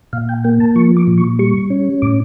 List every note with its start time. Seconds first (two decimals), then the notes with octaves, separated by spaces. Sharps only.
0.13 A#2 F5
0.29 G5
0.44 A#3 G5
0.60 A5
0.75 F3 C#6
0.97 D6
1.07 A#2
1.18 C#6
1.39 G3 C#6
1.70 C#4
2.02 A2 D6